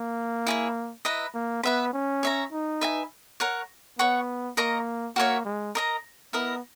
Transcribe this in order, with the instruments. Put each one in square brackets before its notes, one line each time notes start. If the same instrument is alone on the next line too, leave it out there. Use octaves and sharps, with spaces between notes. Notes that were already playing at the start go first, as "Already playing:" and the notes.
Already playing: [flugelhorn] A#3
[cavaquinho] E4 G#4 C#5
E4 B4 D#5 A#5
[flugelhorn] A#3
[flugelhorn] B3 [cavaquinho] B4 E5 B5
[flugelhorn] C#4
[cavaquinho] C#5 E5 A#5
[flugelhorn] D#4
[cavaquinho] B4 E5 G#5
A#4 C#5 F#5
[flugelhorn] B3 [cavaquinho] C#5 F#5 C#6
[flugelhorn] A#3 [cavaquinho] A#4 D#5 A#5 C#6
[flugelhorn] A#3 [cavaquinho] F#4 A#4 C#5 E5
[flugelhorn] G#3
[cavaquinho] A#4 D#5 A#5
[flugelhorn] B3 [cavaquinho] E4 A#4 D#5